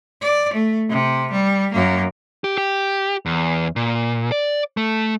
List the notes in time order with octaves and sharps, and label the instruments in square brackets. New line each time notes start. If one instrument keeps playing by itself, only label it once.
[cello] D5
A3
C3
G3
F#2 A#3
[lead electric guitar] G4
G4
E2
A#2
D5
A3